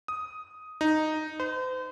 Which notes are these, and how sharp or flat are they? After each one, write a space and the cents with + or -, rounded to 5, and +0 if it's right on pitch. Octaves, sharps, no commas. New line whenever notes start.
D#6 +5
D#4 -5
C5 -40